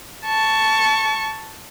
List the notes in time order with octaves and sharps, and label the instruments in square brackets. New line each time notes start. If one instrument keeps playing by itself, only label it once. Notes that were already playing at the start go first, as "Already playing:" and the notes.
[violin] A5 C#6